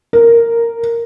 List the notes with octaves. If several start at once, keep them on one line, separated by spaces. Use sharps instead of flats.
A#4